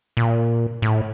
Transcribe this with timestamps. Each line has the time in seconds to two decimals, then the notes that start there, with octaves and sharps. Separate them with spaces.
0.17 A#2
0.82 A2